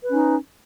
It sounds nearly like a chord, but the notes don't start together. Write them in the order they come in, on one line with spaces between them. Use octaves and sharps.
B4 C#4 D#4